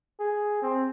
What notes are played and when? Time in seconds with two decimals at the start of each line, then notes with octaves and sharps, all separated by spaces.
0.20 G#4
0.62 C4